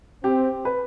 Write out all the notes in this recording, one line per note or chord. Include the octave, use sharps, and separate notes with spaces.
C4 G4
B4